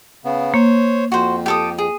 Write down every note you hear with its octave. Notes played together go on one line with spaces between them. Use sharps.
C#3 B3
A#3 C5 C#5
F2 F#4 C5
G4 A4 D#6
G#4